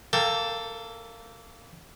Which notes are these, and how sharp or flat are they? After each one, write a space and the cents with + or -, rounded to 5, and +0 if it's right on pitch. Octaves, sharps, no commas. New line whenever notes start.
A#3 -15 A4 +5 G5 +0